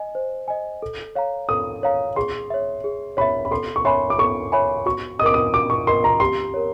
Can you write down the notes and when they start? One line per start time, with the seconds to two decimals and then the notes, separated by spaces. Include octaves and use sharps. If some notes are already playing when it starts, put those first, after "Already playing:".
Already playing: D#5 G#5
0.15 C5
0.48 D#5 G#5
0.82 A4
1.15 C#5 F5 A#5
1.49 A4 D#6
1.83 C#5 F5 A#5
2.16 G#4 C6
2.50 C#5 E5
2.84 G#4
3.17 C#5 E5 B5
3.45 B5
3.51 A4 C6
3.76 C#6
3.85 C#5 E5 G#5 B5 C6
4.10 D6
4.18 A4 C#6
4.52 C#5 E5 G#5 B5
4.86 F#4 C#6
5.19 D#5 D#6
5.23 A#4 D6
5.34 D#6
5.53 F#4 D6
5.70 C#6
5.87 A#4 D#5 C6
6.04 A#5
6.20 G4 C6
6.54 A#4 C#5